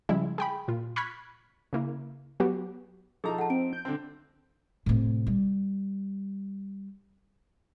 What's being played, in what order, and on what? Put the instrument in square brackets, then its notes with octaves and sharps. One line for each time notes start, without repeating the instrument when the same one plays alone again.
[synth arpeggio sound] C#3 F3 G3 G#3 E4
G#4 G5 B5
A#2 F4
B5 C#6 F6 F#6 G#6 B6
C#3 A#3 E4
F#3 B3 F#4 G4
[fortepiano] F3 D#4 A#5 [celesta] G#4 D#6 [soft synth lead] A4
[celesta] F#5 A5
[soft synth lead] C4 [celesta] D7
[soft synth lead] G6
[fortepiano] D3 C4
[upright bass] A2 C3
G3